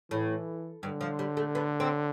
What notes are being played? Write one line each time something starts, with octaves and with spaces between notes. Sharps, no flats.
A2 E3
G2 D3
F3
G3
A3
B3
C4